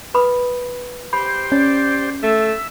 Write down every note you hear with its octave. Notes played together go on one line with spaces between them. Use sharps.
B4 B5 D#6
G4 C5 B5
C#4 D5
A3 E5